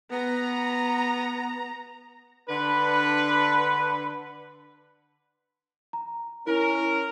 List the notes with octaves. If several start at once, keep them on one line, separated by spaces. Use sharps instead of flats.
B3 A#5
D3 D4 B4
A#5
C#4 E4 A#4